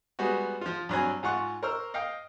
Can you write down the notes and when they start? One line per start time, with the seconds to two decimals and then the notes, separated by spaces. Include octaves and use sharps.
0.19 G3 G#3 B3 F#4
0.61 F3 F4
0.89 G2 F#3 C4 G#5
1.23 G#2 F4 F#5 C#6
1.63 A#4 C5 A#5 C#6 E6 F6
1.94 D#5 F5 G5